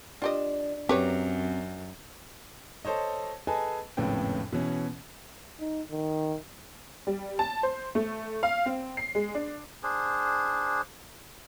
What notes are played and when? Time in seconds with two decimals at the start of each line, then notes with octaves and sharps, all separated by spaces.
0.22 D4 F4 G4 D#5
0.89 F#2 C4 G4 B4 C#5 A#5
2.85 A4 C5 C#5 D#5
3.47 G#4 A4 B4 D#5 G#5 A5
3.97 G#1 F2 A2 C#3 B3 G5
4.52 B2 E3 C#4
5.60 D#4
5.91 D#3
7.07 G3
7.39 A5
7.63 C5
7.95 A3
8.43 F5
8.66 C4
8.97 C7
9.15 G#3
9.35 D4
9.83 D4 G#4 C5